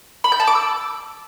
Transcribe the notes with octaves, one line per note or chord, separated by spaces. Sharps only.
B5
G6
A5
D6
E6